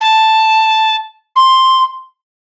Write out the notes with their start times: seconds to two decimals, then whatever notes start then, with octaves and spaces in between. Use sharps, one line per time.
0.01 A5
1.36 C6